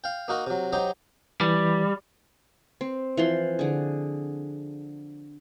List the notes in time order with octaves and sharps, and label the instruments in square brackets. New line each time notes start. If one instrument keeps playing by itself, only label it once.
[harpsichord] F5 G5
A#3 D#4 F#4 A#4
C3 F#3
F#3 D#4 G4 C5 D#5
[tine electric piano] E3 [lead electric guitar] G3
[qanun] C4
E3 F3 C6
D3 G#4